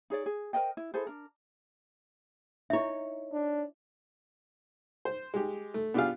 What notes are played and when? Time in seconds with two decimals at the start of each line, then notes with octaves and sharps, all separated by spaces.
0.10 D#4 G#4 C#5 D5
0.26 G#4
0.53 A#4 C5 D#5 G5
0.77 E4
0.94 E4 G#4 A4 C5
1.07 D4 A#4
2.70 D#4 E4 C#5 E5
3.33 D4
5.05 C5
5.34 G#3 G4
5.74 A3
5.94 B3 D4 F4 G4 G#4 F5